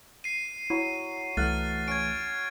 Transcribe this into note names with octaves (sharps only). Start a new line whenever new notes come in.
C7 D#7
F#3 E4
C2 E3 A3 F#5 F6 A6
C#4 G#6 D7